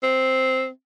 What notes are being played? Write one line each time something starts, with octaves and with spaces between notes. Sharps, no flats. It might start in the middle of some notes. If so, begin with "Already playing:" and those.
C4